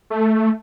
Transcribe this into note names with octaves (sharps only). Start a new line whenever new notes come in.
A3